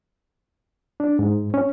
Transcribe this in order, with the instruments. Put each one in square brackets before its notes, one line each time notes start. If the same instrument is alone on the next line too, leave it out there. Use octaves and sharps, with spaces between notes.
[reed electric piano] D4
G#2
C#4